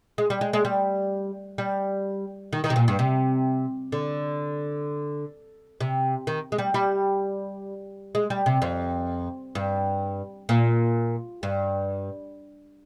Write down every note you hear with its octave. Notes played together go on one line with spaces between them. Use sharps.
G#3
G3
G#3
G#3
G3
G3
D#3
D#3
C3
A#2
G2
C3
D3
C3
D#3
G#3
G3
G3
G#3
G3
C3
F2
G2
A#2
G2